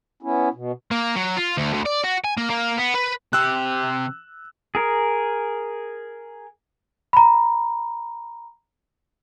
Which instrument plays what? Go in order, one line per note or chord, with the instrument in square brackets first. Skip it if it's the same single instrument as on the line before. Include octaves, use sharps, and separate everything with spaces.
[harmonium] B3 C#4 E4
B2
[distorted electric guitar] A#3
F#3
F4
D2
D2
D5
F#4
G#5
A#3
A#3
B3
B4
[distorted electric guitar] C3 G4 [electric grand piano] E6 F#6
[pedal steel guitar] G#4 A#4
[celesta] A#5 B5